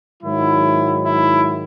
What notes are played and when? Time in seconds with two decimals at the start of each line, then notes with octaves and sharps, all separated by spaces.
0.22 G#2 D#3 F#3 E4
1.05 E4